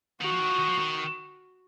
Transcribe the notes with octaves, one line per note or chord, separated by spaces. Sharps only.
D#3 F#4
F3
D#3
F3
D#3
F3
D#3